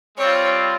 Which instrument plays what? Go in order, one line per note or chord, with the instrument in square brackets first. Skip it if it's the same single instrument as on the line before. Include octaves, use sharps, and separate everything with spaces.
[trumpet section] G3 C4 F4 [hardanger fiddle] C#5